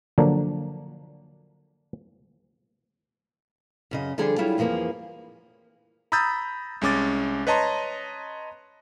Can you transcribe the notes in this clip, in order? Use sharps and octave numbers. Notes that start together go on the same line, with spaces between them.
D3 F3 F#3 A#3 D4
F#2 C#3 D#5
D3 F3 G3 D4 G#4 A4
F#3 G3 E4 F4 G#4
F2 E3 F3 A#3 G#4
A#5 B5 D#6 E6 G6 A6
C2 G#3 C#4 D6 A6
B4 C#5 D#5 A5 A#5 C6